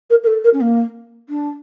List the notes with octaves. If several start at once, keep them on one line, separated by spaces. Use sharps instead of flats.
A#4
A#4
A4
A#4
C#4
A#3
D4